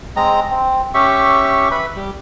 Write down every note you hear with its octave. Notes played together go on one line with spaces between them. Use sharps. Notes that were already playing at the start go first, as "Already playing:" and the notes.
G#3 C4 D#5 A#5
C4
C#4 G4 E5 C#6
B4 E5 B5
G3